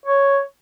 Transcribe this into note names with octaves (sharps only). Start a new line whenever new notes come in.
C#5